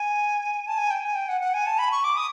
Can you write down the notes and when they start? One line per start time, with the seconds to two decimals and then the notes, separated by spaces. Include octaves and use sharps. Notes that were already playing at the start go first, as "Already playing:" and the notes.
Already playing: G#5
0.68 A5
0.78 G#5
0.91 G5
1.03 G#5
1.15 G5
1.29 F#5
1.41 F#5
1.54 G#5
1.67 A5
1.79 B5
1.92 C#6
2.04 D6
2.17 D#6